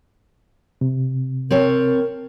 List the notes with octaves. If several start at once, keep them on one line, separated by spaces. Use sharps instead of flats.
C3
C4 A4 A#4 C#5